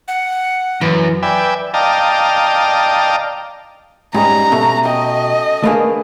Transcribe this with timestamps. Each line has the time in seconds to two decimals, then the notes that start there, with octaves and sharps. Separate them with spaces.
0.08 F#5
0.81 F#2 E3
1.23 B4 D5 E5 G5 G#5
1.74 D5 D#5 F5 G5 A5 A#5
4.14 G#2 G3 C#4 D#5 A#5
4.52 B2 A3
4.85 D#5 G5
5.64 A3 A#3 D4 G#4 B4